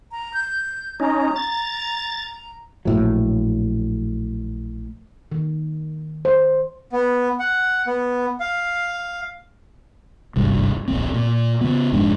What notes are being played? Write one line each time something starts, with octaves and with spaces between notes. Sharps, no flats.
A#5
G6
C#4 D#4 A#5
A6
A#1 A2 F#3
D#3
C5
B3
F#5
B3
F5
D1 G#1 G2 C3
D1 A#1 C4
A#2
C#3 B3
F1 G#2 F3 D4